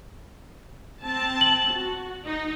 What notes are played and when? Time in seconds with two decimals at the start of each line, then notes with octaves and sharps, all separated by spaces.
1.04 C4 A5
1.41 F#7
1.73 F#4
2.25 D#4